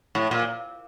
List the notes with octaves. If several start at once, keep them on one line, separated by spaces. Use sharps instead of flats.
A2
A#2